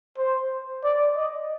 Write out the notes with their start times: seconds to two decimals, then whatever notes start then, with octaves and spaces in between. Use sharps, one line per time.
0.18 C5
0.83 D5
1.16 D#5